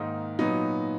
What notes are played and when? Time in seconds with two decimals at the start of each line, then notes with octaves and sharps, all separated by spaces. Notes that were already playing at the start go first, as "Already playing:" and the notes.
Already playing: G#2 D#3 A#3 D#4
0.39 A#2 F#3 B3 D#4